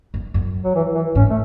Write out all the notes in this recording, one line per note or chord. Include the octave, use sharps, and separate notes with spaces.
F#2
F#2
F#3
E3
E3
G#2 C#4
A3